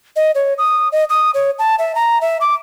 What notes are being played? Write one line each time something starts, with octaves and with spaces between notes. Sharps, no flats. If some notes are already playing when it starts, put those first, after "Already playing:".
D#5
C#5
D#6
D#5
D#6
C#5
A5
E5
A#5
E5
D6